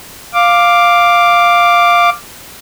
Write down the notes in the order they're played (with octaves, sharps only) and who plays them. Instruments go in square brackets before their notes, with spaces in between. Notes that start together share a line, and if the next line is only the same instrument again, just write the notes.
[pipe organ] F5 D6